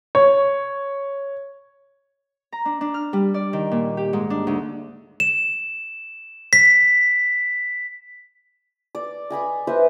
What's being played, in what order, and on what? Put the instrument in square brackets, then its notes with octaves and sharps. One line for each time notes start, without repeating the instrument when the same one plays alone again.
[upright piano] C#5
[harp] A#5
D4
D4
F6
G3
D5
D#3
A#2
G4
G#2
D4
D2
[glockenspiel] E7
B6
[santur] D5
D#5 G#5 B5 D6
B4 C5 D#5 E5